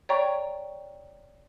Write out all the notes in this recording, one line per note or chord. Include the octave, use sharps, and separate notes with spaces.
C#5 D5 G5 A#5 C#6